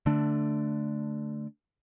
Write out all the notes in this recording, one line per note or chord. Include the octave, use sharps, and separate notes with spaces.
D3 A3 D4